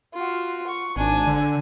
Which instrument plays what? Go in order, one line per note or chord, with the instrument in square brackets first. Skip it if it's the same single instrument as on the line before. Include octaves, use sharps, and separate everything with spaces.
[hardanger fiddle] F4 F#4
C#6
[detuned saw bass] G#1 [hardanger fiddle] D4 G#5
[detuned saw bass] D3